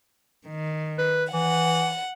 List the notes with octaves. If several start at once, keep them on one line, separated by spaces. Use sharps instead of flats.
D#3
B4
E3 F#5